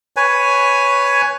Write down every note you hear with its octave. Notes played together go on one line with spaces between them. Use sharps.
B4 C#5 G#5